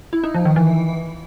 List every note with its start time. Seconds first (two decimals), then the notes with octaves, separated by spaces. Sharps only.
0.13 E4
0.24 D#4
0.34 F3
0.45 D#3
0.56 E3